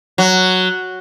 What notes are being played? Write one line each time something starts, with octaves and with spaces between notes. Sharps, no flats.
F#3